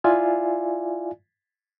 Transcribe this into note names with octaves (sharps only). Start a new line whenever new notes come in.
E4 F4 D5 E5 F5 G#5